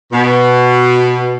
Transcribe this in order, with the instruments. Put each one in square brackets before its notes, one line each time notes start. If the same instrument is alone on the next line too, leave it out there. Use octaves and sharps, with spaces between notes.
[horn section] B2